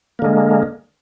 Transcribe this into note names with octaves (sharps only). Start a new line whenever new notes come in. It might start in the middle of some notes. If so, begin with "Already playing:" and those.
D3 G#3 A#3